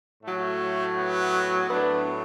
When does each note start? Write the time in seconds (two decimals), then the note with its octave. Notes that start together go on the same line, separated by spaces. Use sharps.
0.23 A2 F#3 A3
0.96 B3
1.70 A2 F#3 B3 D4